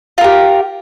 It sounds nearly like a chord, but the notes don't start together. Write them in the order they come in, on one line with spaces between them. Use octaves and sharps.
F4 A#4 G4